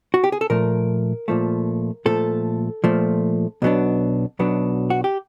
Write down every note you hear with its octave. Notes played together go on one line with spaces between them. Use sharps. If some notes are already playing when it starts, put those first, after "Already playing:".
F#4
G4
G#4
A4
A#2 F3 A3 A#4
A#2 F3 A3
A#2 F3 A3 A4
A#2 F3 A3
B1 B2 F#3 B3 D4
B1 B2 F#3 B3 D4
F#4
G4